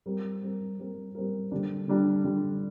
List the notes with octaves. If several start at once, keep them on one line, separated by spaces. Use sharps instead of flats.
G3 C4 A#4
G3 C4 A#4
G3 C4 A#4
G3 C4 A#4
D3 G3 D4
D3 G3 D4
D3 G3 D4